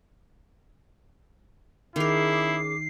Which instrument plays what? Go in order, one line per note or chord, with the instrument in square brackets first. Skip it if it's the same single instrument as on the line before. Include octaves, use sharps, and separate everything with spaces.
[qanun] D#3 A#4 [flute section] C#4 G#4 D6 [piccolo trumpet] E4 [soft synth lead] C7